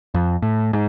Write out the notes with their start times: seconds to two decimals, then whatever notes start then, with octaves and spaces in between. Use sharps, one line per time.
0.14 F2
0.42 A2
0.73 G#2